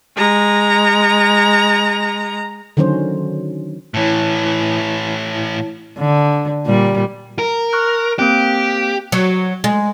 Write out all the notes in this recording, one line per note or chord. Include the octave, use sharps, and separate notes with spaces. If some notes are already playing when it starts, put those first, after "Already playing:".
G#3 A#5
D3 D#3 F#3 C#4 C5
A2 E3 E4 C#5 A5
D3
A#2 G3
A#4
C#6 F6 F#6
A#3 C4 G4 F#6
F#3
G#3